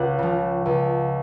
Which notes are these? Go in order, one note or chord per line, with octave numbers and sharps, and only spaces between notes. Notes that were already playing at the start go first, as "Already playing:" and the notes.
Already playing: C#2 F#5 F#6
C#3 F3
C#2